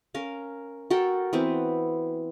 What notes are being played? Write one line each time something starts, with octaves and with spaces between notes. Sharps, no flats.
C#4 A#4 F5
F#4 A4 A#4 G5
E3 B3 C4